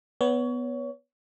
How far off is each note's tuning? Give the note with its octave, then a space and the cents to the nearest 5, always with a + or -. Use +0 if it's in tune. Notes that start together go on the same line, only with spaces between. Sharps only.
B3 +0 C#5 +25